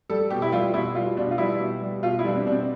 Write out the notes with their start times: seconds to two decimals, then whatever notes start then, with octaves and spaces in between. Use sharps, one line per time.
0.10 G3 A4
0.30 B2 G4
0.42 E4
0.52 G3 F4
0.74 B2 E4
0.95 G3 F4
1.17 B2 D4
1.31 F4
1.38 G3 E4
1.60 B2
1.81 G3
2.03 B2 F4
2.19 E4
2.24 G3 D4
2.35 C4
2.47 B2 D4
2.52 C4